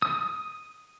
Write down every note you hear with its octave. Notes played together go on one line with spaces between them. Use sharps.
D#6